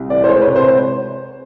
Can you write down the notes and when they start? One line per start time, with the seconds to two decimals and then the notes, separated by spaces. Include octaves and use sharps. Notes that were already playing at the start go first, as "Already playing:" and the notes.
Already playing: C2
0.10 E3 D5
0.24 C5
0.28 G#3 C#5
0.42 B4
0.47 C3
0.56 C5